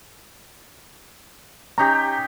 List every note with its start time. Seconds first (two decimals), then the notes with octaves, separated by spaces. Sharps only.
1.78 C#4 D#4 G4 A#5